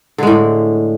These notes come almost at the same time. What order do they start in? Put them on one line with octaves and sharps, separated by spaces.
D3 G#3 A2